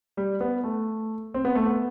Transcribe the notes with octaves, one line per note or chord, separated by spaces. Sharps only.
G3
B3
A3
C4
B3
A3
B3